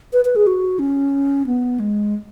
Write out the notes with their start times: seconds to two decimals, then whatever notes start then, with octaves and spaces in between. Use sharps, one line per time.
0.13 B4
0.25 B4
0.36 G#4
0.47 F#4
0.79 C#4
1.47 B3
1.80 G#3